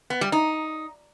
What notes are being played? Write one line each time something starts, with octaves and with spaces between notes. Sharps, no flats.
B3
G3
D#4